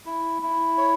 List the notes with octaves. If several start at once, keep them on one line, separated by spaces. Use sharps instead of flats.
E4
E4
C#5